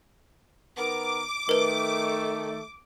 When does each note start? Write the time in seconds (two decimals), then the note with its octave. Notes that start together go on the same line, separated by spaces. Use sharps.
0.78 D#3 B3 A#4 D6
1.49 D#3 A3 A#4 B4